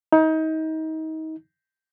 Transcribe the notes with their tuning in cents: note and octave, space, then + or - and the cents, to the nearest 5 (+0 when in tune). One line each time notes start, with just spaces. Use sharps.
D#4 +30